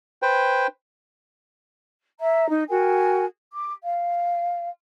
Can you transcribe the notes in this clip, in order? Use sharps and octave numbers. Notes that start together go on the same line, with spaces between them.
B4 C5 G5
E5 A#5
D#4
F#4 A#4 G5 G#5
D6
F5